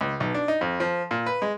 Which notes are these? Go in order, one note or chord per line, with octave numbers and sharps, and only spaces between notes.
C#2
B1
D4
D#4
F2
F3
A#2
B4
G#3